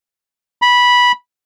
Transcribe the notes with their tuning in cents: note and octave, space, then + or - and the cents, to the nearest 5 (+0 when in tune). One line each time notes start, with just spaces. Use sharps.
B5 -10